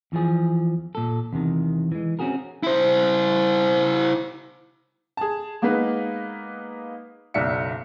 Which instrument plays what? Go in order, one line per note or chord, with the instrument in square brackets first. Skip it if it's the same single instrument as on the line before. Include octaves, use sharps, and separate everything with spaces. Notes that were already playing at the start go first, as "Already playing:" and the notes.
[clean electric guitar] E2 E3 F3 G#4
A#2 A4
E2 C3 D#3
E3 G#3
C4 C#4 D#4 F#4 G#4 A#4
[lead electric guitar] E4 C5
[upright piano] G#4 A5
G#3 A#3 B3 D#4 B4
F#1 B1 D5 E5 C#7